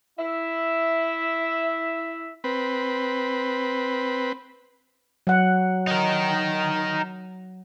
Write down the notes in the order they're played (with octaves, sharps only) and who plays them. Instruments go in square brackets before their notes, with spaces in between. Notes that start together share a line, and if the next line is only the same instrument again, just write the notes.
[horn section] E4 E5
[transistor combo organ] C4 B4
[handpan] F#3 F#5
[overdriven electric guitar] D#4 A#4